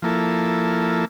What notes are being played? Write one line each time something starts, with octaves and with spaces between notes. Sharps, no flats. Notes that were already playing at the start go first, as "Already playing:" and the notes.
F3 A#3 E4 A4